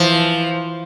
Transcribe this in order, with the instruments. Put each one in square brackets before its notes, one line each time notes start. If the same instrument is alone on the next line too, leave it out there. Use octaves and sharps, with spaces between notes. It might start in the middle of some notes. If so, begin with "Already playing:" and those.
Already playing: [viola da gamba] E3 [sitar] F3